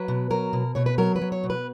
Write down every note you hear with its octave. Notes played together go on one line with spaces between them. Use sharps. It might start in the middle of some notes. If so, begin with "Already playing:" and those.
Already playing: F#3 B4
B2
F#3 A#4
B2
B2 C#5
B4
F#3 A#4
B4
F#3
C#5
B2
B4